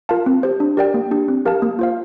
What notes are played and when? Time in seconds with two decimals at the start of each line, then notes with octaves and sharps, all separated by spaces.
0.09 F4 A#4 F5 A5
0.26 C4
0.43 G4 C5
0.60 D4
0.77 G4 A#4 D5 G5
0.94 A#3
1.11 D4 G4
1.28 C4
1.45 G4 A#4 F5 A5
1.62 A#3
1.79 F4 C5 F5